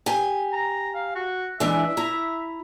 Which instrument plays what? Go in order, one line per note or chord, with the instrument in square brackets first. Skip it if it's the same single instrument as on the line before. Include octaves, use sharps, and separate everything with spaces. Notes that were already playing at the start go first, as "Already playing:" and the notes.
[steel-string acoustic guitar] G4 G#5
[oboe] A#5
F5
F#4
[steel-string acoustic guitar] E3 G#3 D4 [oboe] E5
[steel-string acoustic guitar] E4 A#5